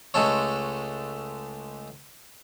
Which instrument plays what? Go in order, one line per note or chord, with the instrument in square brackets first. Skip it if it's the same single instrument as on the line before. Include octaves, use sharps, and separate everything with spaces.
[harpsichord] C#2 G#3 A3 A4 C#5